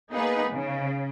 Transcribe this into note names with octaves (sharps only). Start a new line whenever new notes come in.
A#3 B3 D#4 G#4 B4
C#3